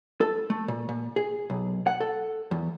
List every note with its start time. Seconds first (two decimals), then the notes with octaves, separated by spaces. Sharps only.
0.21 A4
0.50 A3
0.68 A#2
0.89 A#2
1.16 G#4
1.50 B1
1.87 F#5
2.00 A4
2.51 E2